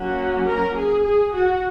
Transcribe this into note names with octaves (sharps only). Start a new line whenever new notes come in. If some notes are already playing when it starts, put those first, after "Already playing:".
Already playing: F#3 A#3 C#4 F#4
A#4
G#4
G#4
F#4